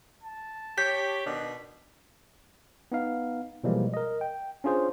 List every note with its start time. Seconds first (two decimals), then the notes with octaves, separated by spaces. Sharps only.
0.23 A5
0.78 G4 C#5 G6 B6
1.26 B2 D#3 D4
2.92 B3 D#4 F5
3.64 B2 E3 F3 G3 G#3 A#3
3.94 A#4 D#5
4.21 G5
4.64 C#4 D4 F4 G#4 C5